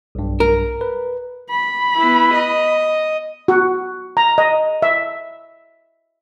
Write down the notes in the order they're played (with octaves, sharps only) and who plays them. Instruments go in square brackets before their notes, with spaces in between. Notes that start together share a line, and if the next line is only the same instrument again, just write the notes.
[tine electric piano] B1 G2
[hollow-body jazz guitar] A#4
[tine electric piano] B4
[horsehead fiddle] B5
[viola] B3 E4
D#5
[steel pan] F#4
A#5
D#5
E5